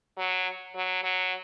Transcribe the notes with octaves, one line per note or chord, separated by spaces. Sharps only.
F#3
F#3
F#3